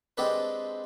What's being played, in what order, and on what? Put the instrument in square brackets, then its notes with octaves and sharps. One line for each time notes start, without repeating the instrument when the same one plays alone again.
[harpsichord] G#3 C4 D4 G4 A4 B4